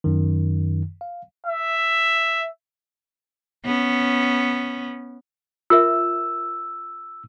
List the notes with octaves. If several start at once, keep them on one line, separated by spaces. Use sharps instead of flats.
F#2 D#3
F5
E5
B3 C#4
F4 A#4 E5 E6